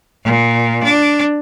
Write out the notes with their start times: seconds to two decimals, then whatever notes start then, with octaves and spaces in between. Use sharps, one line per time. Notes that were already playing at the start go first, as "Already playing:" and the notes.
0.24 A#2
0.83 D4